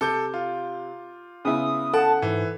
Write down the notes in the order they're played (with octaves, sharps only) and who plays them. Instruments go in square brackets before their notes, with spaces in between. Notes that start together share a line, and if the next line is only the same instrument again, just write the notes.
[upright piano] C3 [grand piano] A4 D6 G6
[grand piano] F4
[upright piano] C#3 B3 E4 [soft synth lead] D#6
[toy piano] A4 [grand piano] F#5 [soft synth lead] A5
[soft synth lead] G#2 [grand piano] E3